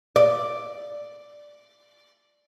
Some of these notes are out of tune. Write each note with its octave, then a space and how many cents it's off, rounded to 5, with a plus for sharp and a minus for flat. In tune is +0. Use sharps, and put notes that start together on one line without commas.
D5 +0